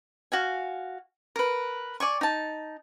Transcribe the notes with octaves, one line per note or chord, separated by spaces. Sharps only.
F#4 F5 G#5
A#4 B4
D5 G#5 C#6
D#4 A5